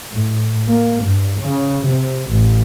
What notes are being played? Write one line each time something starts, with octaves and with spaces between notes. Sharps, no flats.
A2
A#3
G2
C#3
C3
A1